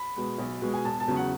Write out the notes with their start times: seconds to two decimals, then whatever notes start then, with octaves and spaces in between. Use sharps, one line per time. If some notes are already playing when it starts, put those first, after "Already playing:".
Already playing: B5
0.16 B2 G#3
0.38 B1
0.62 B2 G#3
0.74 G#5
0.85 E1 A5
1.00 A5
1.07 E2 C#3 F#3
1.16 F#5